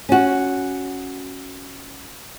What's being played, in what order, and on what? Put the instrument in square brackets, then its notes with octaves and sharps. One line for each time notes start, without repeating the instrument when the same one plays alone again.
[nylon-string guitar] C#4 F#4